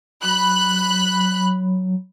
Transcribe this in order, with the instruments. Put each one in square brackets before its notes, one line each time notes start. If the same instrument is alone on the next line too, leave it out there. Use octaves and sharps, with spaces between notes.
[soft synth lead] F#3 [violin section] B5 F#6